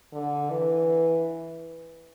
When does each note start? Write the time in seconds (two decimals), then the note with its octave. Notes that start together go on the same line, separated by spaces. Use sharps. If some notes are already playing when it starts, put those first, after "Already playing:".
0.13 D3
0.50 E3